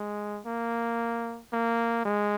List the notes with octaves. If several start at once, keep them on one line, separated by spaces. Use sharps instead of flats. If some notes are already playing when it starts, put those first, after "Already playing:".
Already playing: G#3
A#3
A#3
G#3